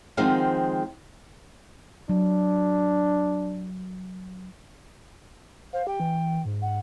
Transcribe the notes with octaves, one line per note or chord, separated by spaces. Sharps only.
D#3 F3 G#3 C4 F5 F#5
F#3 D4
C5 F5
G4 G5
E3
G#2
F#5